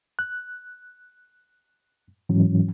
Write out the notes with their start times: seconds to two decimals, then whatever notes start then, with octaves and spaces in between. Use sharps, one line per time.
0.19 F#6
2.29 G#2 E3 F#3 C#4